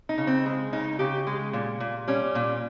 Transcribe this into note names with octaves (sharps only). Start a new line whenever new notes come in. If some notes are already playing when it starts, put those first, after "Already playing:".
D#4
C#3
C4
G#3
C#3 D#4
C#3 G4
G#3
A#2
A#2
G3 C#4
A#2